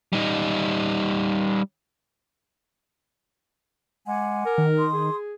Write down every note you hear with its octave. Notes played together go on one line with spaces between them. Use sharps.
G3 D#4
G#3 F#5 G#5 D6
A#4
D#3
C6 D#6
G#4